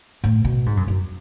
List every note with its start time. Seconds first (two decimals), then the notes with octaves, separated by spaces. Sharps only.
0.24 A2
0.45 B2
0.66 G#2
0.77 F#2
0.88 F#2